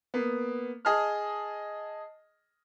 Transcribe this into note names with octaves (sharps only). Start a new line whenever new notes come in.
A#3 B3
G#4 D#5 A5 F6